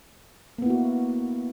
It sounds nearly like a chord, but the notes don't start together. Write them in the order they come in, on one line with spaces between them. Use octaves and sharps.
A#3 B3 E4 F#4